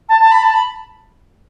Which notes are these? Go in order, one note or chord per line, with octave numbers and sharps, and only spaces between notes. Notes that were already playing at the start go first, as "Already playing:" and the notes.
A5
A5
B5
A5
B5